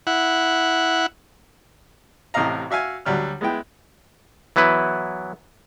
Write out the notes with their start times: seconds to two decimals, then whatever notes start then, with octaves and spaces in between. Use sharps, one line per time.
0.07 E4 F#5
2.34 A1 A2 C3 D#5 F5 A#5
2.70 F#4 E5 F5 G#5
3.06 D2 F#3 G3 F6
3.41 G#3 B3 E4 G5
4.56 E3 F#3 B3 E4 B4